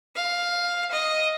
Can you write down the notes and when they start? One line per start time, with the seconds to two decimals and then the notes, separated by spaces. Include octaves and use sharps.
0.16 F5
0.92 D#5